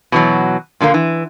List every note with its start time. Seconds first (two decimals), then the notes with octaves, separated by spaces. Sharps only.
0.12 B2 E3 F#3
0.81 A#2 D3 A3 A#3
0.94 E3